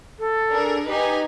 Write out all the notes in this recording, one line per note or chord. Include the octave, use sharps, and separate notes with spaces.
A4
D4 G#4 A#4
D#4 G4 B4 G#5